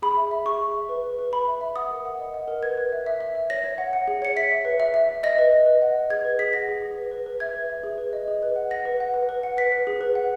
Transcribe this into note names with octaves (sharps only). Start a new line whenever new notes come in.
G#4 B5
E5
E5
G#4 C#6
G#4
E5
B4
B4
B4
B4 B5
E5
E5
F#5 D#6
A#4
F#5
D#5
F#5
A#4
B4 G#6
B4
E5
E5
E5
E5
C#5 A#6
C#5
F#5
F#5
G#4
C#5 C#7
E5 B6
E5
B4
E5
E5
E5
D#5 A#6
B4
D#5
B4
F#5
D#5
G#4 G#6
B4
G#4 B6
F#5 A#6
G#4
G#4
B4
B4
B4
E5 G#6
B4
E5
G#4
B4
D#5
G#4
B4
F#5
F#5 A#6
B4
F#5
B4
B4
F#5
B4 B6
B4
G#4
B4
F#5